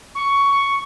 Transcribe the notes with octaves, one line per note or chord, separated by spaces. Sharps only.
C#6